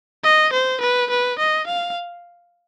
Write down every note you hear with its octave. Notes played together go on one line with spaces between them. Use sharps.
D#5
C5
B4
B4
D#5
F5